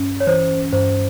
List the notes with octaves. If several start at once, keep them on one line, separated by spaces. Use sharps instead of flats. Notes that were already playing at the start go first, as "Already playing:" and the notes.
Already playing: G2 C#4
C#5
E3 C5
G2 C5